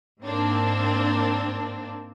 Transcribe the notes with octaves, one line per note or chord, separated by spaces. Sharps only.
G#2 A#3 C4 D4